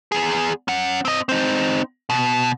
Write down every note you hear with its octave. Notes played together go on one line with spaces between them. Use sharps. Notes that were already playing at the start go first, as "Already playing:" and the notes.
E2 G#4
C#4 F#5
C4 D#5
C4 D#4
B2